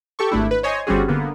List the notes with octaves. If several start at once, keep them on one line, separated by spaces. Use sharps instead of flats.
G4 A4 C#6
G#1 A3 D4 E4
B4
C5 C#5 D#5 G#5
G1 G3 C4 C#4 F#4 G#4
D3 A#3 B3